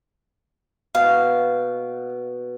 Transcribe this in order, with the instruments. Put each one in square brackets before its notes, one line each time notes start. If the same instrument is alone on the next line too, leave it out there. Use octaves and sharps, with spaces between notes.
[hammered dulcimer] B2 [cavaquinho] F5